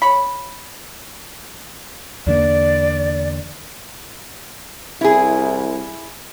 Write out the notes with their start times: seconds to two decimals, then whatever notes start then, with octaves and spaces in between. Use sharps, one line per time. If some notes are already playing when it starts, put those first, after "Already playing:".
0.02 C#5 B5
2.27 E2 D3 A#3 D5
5.01 C2 E4 G#4